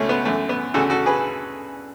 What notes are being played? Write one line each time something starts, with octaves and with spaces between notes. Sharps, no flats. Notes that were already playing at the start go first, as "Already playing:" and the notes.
Already playing: C#2 B2 A3 C#4
B3
F#2 E3 A3
B3
D2 C#3 E3 F#4 A4
F#4 A4
G#4 B4